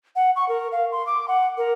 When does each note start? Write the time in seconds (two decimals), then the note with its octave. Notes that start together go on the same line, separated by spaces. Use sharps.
0.16 F#5
0.36 C#6
0.49 A#4
0.72 F5
0.92 C6
1.07 D6
1.28 F#5
1.58 A#4